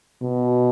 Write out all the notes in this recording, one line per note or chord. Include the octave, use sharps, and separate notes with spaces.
B2